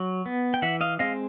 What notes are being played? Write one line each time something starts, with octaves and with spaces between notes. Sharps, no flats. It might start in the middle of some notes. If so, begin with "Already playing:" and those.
Already playing: F#3
B3
G5
E3 E5 F#5
D#5 F5
G#3 C4 D#5 F5